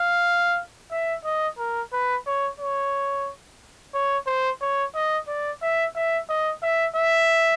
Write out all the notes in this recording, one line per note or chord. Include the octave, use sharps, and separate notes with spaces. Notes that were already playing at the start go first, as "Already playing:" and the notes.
Already playing: F5
E5
D#5
A#4
B4
C#5
C#5
C#5
C5
C#5
D#5
D5
E5
E5
D#5
E5
E5